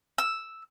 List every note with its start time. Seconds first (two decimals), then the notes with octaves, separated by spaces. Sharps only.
0.18 E6